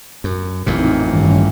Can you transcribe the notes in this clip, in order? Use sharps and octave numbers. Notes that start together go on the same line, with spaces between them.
F#2
A1 F2 A#2 C4 D#4
G2 D#3 C#4